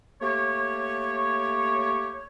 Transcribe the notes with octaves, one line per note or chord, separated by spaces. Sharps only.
A3 A#3 G4 C#5